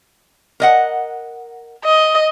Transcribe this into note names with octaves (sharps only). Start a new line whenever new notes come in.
A#4 D#5 F#5
D#5